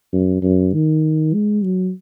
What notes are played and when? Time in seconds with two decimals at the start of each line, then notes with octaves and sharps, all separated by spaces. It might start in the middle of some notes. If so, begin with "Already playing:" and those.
0.13 F#2
0.43 F#2
0.73 D#3
1.34 G#3
1.64 F#3